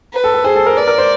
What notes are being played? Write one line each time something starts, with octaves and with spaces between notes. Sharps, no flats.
B4
A4
A4
G#4 C5
A4
A#4
B4 D5
A#4
C5